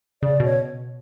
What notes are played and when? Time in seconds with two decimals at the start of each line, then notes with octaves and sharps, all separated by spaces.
0.23 C#3 D5
0.40 B2 C#5